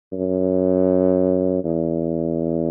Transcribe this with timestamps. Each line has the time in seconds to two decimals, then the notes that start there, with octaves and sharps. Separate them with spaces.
0.13 F#2
1.64 E2